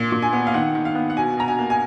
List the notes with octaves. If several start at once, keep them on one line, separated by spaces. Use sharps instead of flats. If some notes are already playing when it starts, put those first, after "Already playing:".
Already playing: A#2
A#2
G#5
B3
F5
D#3 F#5
D#3
F5
B3
F#5
B2 G#5
B2 A#5
G#5
A#3
G#5